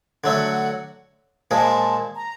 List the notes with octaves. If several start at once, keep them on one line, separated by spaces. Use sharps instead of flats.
D3 F#3 A3 F#5
A#2 F3 G#3 A5
A#5